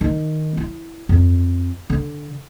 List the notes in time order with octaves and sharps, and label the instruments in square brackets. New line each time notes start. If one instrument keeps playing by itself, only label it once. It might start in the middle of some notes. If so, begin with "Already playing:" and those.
[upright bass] D#3
E4
F2
D3